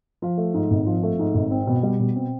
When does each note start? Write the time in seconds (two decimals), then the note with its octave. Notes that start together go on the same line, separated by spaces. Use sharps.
0.22 F3
0.37 A3
0.54 G#2
0.71 G#1
0.86 F3
1.03 A3
1.19 G#2
1.34 G#1
1.51 C4
1.67 B2
1.83 G3
2.00 B2
2.16 C4